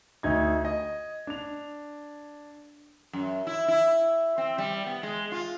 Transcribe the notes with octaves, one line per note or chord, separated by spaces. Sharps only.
D2 D#4 G#6
D#5
D4 F7
F#2
E4
E4
C4
G3
B3
G#3
F4